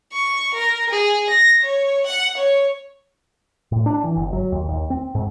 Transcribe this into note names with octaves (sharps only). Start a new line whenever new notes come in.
C#6
A#4
G#4
A#6
C#5
F#5
C#5
A2
D4
E3
G1
F#3
D#2
D#2
C4
G#2